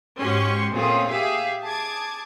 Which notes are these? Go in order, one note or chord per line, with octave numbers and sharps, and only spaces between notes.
G#2 C#4 F#4 G4 C6 C#6
A#2 A3 C4 C#4 F4 G#4
G4 G#4 E5 F5
G#4 A5 D6 G#6